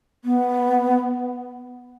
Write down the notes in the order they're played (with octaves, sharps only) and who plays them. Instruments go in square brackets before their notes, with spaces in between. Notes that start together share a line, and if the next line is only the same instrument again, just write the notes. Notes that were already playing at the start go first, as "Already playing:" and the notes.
[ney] B3